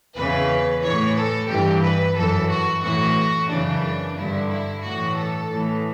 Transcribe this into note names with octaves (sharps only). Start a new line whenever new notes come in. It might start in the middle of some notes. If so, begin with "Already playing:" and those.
E2 C#3 E3 B4
A2 E3 C#5
A4
G2 E3 G4
B4
F#2 E3 A4
F#4
A2 E3 F#4
F#2 C#3 E3 D4
G2 D3 E4
E4
A2 E3 F#4
A4
A2 E3